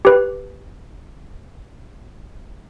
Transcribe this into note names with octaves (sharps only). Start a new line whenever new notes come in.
G4 B4